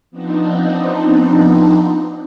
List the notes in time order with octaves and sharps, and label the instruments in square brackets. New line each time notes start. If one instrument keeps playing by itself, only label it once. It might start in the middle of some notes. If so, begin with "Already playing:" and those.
[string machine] F3 B3 C4 D4 D#4